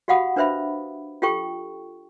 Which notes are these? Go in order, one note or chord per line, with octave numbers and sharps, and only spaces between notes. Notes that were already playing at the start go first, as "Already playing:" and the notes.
F#4 G4 F5 F#5 B5 D#6
D4 B4 C5 E5 B5
F4 G4 A4 G5 C#6